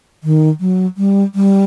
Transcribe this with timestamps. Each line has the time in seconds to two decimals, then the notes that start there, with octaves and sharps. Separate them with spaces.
0.24 D#3
0.60 F#3
0.97 G3
1.35 G3